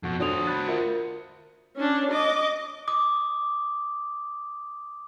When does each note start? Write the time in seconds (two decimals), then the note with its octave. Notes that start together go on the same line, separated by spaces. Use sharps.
0.03 F2 B2 F#5 C#6
0.20 D4 F#4 A4 C5 C#5 D#6 F7
0.47 B5 F#6 G6 A6
0.68 F4 A#4 E5 F#5 C#7
1.76 C#4 D4
2.12 D#5 D6
2.88 D6 D#6